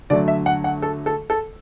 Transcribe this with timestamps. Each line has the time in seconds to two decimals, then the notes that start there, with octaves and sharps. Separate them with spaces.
0.10 D3 F#3 A3 D5
0.28 E5
0.46 F#5
0.64 F#5
0.82 A4
1.06 A4
1.30 A4